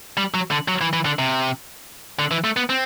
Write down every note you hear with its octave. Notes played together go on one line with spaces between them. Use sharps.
G3
F#3
D3
F#3
E3
E3
D3
C3
D3
E3
A3
B3
C4